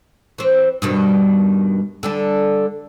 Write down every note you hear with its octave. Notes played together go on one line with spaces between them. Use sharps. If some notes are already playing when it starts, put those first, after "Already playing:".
E3 C4
G2 B2 D#3
D3 G3 D4